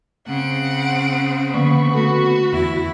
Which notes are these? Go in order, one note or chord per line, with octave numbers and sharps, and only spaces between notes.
C#3 C4 F#5 D7
D3 F3 A#3 B3 B5 C#6
A3 F#4 A4
E2 E4 B5